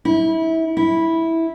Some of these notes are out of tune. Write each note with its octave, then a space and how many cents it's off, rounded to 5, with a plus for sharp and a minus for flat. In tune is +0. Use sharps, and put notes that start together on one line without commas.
E4 -25
E4 -10